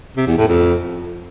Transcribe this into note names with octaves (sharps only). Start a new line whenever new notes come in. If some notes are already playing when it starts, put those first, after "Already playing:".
C3
E2
A2
F2